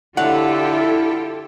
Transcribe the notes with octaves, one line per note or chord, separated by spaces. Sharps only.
D3 E4 F4 G4 A4 C#5 F#5